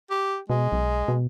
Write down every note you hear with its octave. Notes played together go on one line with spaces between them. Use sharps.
G4
B2 G#3
B1
B2